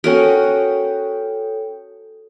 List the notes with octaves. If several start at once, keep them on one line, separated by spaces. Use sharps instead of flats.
C#4 F#4 A4 A#4 C#5 G5